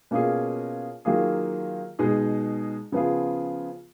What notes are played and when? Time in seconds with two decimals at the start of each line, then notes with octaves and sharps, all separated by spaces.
0.11 B2 A#3 C#4 F4 G#4
1.05 D#3 F#3 A#3 F4 G#4
1.99 B2 G#3 D#4 G#4
2.92 C#3 F3 B3 F4 G#4